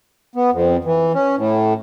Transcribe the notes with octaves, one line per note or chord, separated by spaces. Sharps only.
B3
F2
E3
C#4
A2